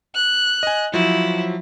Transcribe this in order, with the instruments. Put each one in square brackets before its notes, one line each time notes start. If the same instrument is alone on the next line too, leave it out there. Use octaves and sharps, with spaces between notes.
[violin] F#6
[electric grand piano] D#5 G#5
[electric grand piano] F3 F#3 [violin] E4